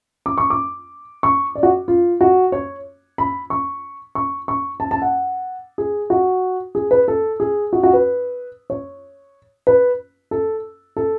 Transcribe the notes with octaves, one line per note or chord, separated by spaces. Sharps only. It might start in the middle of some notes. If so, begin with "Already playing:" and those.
D6
C#6
D6
C#6
D5
F#4
F4
F#4
C#5
B5
C#6
C#6
C#6
A5
A5
F#5
G#4
F#4
G#4
B4
A4
G#4
F#4
F#4
B4
C#5
B4
A4
A4